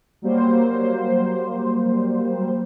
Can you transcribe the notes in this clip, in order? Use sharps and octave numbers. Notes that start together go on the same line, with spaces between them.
F#3 G3 A#3 C5